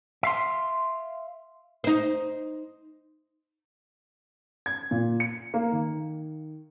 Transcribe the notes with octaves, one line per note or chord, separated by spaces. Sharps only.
E5 F5 C6
D#4 C5
G#6
A#2
C#7
A#3
D#3